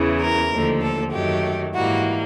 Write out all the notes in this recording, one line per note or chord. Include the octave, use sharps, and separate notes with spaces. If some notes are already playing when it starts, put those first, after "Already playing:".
Already playing: E2 C#3 E3
A#4
D#2 D3 F3 A3
A4
F#2 D#3 F#3 A3 G4
G#2 E3 G3 A#3 F#4